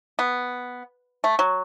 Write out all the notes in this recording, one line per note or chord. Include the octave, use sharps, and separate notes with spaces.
B3
A3
F#3